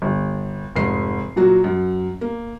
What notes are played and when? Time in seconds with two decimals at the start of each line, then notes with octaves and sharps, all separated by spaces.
0.02 G1
0.76 F1 G#2 C7
1.36 A#2 F#3 F#4
1.64 F#2
2.21 A#3